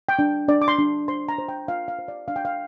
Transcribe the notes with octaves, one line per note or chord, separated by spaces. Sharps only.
G5
D4
D4 D5
D6
C6
D4
C5 C6
A#5
C5
G5
F4 F5
F5
C5
D5
D4 F5
G5
F5